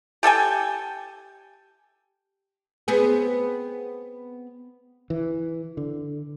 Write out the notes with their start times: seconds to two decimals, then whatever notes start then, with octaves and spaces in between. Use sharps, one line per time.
0.23 G4 A4 G5 G#5
2.88 B3 C4 G#4
5.10 E3
5.77 D3